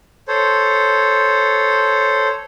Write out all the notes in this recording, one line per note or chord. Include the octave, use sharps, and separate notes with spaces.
A4 C5 C#5